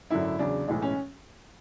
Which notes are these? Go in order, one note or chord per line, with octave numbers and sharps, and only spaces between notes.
G#1 F#2 D3 F#3 E4
E2 C#3 F#3 D4
B1 A2 E3 G#3
C#4